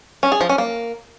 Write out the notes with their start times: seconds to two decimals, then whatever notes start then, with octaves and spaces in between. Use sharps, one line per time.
0.23 C#4
0.32 G#4
0.41 F3
0.49 C#4
0.58 A#3